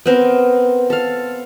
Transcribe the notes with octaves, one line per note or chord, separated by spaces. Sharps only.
B3 C4 A#4
A4 F5